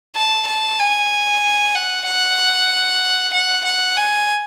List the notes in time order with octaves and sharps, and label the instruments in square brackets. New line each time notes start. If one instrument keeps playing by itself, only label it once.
[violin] A5
A5
G#5
F#5
F#5
F#5
F#5
G#5